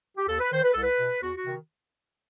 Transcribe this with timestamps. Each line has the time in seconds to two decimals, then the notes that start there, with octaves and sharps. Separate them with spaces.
0.17 G4
0.28 D#2 A4
0.39 B4
0.51 D#3 C5
0.63 B4
0.72 C2 A4
0.82 B4
0.98 B2
1.21 E2 F#4
1.36 F#4
1.45 C3 D#3